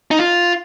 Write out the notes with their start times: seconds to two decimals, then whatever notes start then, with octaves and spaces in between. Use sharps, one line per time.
0.11 D#4
0.19 F4